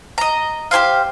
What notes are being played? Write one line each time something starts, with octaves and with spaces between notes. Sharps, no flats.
D#5 A#5
G4 G#4 C5 F5